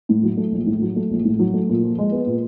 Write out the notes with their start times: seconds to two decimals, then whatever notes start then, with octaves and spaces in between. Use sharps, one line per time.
0.09 A2
0.23 F#3
0.37 A3
0.52 A#1
0.67 A2
0.81 F#3
0.96 A3
1.11 A#1
1.25 A2
1.39 F#3
1.54 A3
1.69 A#2
1.83 F3
1.98 G#3
2.12 B3
2.27 A#2